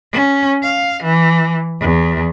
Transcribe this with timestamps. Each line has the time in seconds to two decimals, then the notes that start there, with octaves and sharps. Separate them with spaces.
0.12 C#4
0.63 F5
1.03 E3
1.80 E2